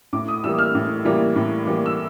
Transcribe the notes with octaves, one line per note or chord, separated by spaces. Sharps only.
A2 D6
D#6
E3 G3 A#3 E6
F6
A2
E3 G3 A#3
A2
E3 G3 A#3
E6